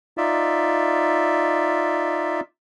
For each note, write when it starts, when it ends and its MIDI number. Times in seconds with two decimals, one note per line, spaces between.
0.18 2.40 63
0.18 2.40 65
0.18 2.40 74
0.18 2.40 76